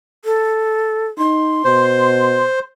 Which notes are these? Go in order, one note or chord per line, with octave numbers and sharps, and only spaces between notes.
A4
D#4 C6
B2 C5